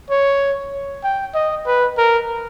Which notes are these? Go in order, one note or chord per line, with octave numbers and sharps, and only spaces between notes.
C#5
G5
D#5
B4
A#4